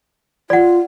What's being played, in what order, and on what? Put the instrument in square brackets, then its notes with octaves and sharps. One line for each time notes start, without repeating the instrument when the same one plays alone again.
[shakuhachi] F4 [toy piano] D5 F#5